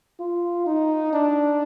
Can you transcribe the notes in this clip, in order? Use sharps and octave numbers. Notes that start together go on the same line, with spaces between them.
F4
D#4
D4